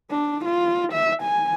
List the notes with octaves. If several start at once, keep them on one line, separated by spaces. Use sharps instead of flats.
D4
F4
E5
G#5